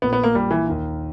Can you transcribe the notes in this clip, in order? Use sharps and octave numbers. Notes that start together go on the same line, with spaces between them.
A#1 A#2 A#3 B3
B3
A#3
A#1 A#2 G3 A#3
E3
D#2 D#3 A#3